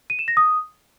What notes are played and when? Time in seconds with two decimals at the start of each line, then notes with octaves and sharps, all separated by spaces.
0.10 D#7
0.19 E7
0.28 A#6
0.37 D#6